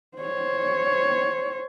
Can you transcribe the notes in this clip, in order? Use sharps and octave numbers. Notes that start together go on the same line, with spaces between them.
C5 C#5